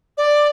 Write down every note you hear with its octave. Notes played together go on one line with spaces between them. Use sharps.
D5